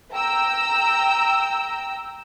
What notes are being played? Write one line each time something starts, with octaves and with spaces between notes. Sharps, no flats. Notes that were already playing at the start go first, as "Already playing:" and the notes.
G5 A#5 E6